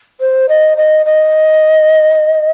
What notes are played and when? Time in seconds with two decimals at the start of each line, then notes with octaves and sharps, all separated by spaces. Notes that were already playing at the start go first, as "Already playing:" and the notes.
0.21 C5
0.49 D#5
0.78 D#5
1.06 D#5